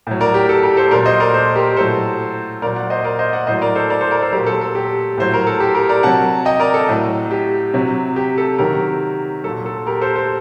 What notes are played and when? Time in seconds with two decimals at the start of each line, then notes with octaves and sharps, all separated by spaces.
0.07 A2 F#3
0.20 A#4 D5
0.34 G4 A#4
0.49 A4
0.63 G4 A#4
0.77 A4 C5
0.91 A#2 F#3 A#4 D5
1.06 C5 D#5
1.20 A#4 D5
1.34 A4 C5
1.56 G4 A#4
1.77 A2 F#3 A4 C5
2.62 A#2 A#4 D5
2.66 F#3
2.76 D5 F#5
2.90 C5 D#5
3.04 A#4 D5
3.19 C5 D#5
3.33 D5 F#5
3.47 A2 C5 D#5
3.51 F#3
3.62 A#4 D5
3.75 A4 C5
3.90 A#4 D5
4.01 A4 C5
4.11 A#4 D5
4.22 A4 C5
4.32 F#3 G4 A#4
4.37 A#2
4.47 A4
4.61 A4
4.75 G4
5.17 A2 F#3 C5
5.34 A#4
5.47 A4
5.60 G4
5.74 G4 A#4
5.89 A#4 D5
6.03 C3 F#3 F#5 A5
6.45 D#5 G5
6.60 A#4 D5
6.74 A4
6.89 A2 F#3
7.31 G4
7.74 C3 F#3
8.16 G4
8.38 A4
8.58 C3 D#3 F#3 G4 A#4
9.44 F#3 A4
9.48 A#2
9.66 A4
9.87 G4 A#4
10.01 A4 C5
10.16 A4 C5